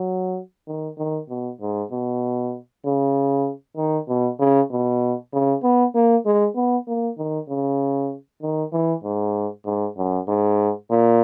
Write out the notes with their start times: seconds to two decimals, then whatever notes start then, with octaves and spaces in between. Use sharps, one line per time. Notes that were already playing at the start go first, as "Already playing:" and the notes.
Already playing: F#3
0.68 D#3
0.98 D#3
1.29 B2
1.61 G#2
1.92 B2
2.85 C#3
3.77 D#3
4.09 B2
4.39 C#3
4.71 B2
5.33 C#3
5.63 B3
5.95 A#3
6.26 G#3
6.56 B3
6.88 A#3
7.18 D#3
7.49 C#3
8.42 D#3
8.73 E3
9.04 G#2
9.65 G#2
9.97 F#2
10.28 G#2
10.90 A#2